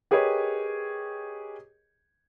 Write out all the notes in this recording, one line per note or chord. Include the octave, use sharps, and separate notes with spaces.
G4 G#4 A#4 B4 C#5 D#5